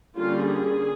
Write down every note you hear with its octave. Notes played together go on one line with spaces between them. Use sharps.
D3 G3 A#3 C#4 F4
G#4